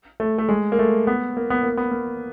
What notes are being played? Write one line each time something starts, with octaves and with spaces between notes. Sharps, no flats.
A3
A3
G#3
A#3
A3
B3
A#3
B3
A#3
B3
A#3